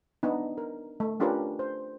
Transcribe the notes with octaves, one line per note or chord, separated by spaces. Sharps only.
B3 D4 D#4
A#4
A3
C#4 D4 F4 G4 A#4 B4
C5